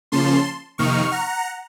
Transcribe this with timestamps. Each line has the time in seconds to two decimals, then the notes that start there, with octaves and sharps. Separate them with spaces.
0.12 C#3 F3 A#3 C#4 A5 C6
0.78 F2 C3 D#3 A#3 D#4 C#6 F6
1.11 F#5 A#5